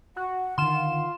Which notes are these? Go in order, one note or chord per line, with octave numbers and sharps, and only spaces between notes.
F#4 F#5
D3 D#3 F4 C6 E7